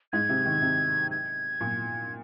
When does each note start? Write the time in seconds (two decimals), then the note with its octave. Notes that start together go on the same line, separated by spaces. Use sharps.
0.13 G#2 G#6
0.29 C3
0.45 D#3
0.62 C3
1.11 G#6
1.61 A#2